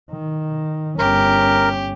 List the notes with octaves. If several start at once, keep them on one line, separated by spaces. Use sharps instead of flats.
D#3
G1 C#4 G4 A#4